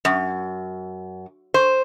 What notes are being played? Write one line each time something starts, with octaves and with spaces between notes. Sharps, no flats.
F#2
C5